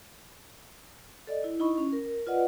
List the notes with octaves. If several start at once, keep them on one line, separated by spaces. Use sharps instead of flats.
A4 D5 D#5
E4
D#4 E4 D#5 B5 C#6
C#4
A#4
F4 B4 D5 D#5 F#5